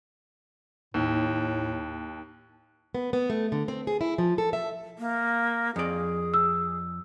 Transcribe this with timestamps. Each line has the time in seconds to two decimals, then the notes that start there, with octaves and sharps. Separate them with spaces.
0.94 D#2 A2
2.95 B3
3.13 B3
3.30 A3
3.52 D3
3.68 C4
3.87 G#4
4.01 E4
4.18 F3
4.38 A4
4.53 E5
4.99 A#3
5.76 F2 G#4 D5
6.34 E6